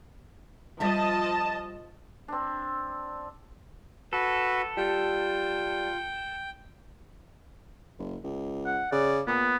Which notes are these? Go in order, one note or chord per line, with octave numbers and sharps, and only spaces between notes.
F3 G3 G4 D#5 E5 A5
C4 D4
F#4 A4 B4
G3 F4 G5
F#1
C#2
F#5
C#3 D5
A#2 B3